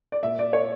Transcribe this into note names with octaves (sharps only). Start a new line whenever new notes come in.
D5
A#2 E5
D5
C#5